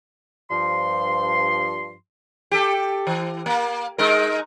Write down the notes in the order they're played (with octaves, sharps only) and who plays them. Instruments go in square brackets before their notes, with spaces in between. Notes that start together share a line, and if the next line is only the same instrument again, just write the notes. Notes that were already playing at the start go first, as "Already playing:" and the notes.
[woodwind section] G2 F3 C6
[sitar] G4 A4
E3
A#3
G#3 D#4 A#4